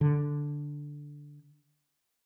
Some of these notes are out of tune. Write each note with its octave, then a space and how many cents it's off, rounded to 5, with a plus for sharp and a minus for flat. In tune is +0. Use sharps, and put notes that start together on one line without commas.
D3 -5